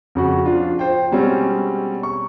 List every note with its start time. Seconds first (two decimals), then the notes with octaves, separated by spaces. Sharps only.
0.15 F2 C#3 F#4
0.44 F3 D4 F4
0.79 C5 G5
1.12 B2 G3 G#3 C4 C#4
2.03 C#6